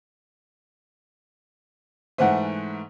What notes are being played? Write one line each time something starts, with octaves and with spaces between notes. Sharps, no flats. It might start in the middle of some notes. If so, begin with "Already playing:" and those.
G#2 E3 A3 C5 F#5